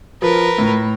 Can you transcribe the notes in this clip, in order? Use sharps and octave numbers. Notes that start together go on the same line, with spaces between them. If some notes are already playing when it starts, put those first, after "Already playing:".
F3 A#4 B4
A2